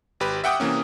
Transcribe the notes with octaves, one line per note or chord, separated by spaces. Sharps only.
G#1 G4 B4
E5 F#5 G5 D6 D#6
C3 E3 A#3 C#4